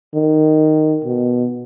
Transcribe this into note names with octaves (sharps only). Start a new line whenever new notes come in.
D#3
B2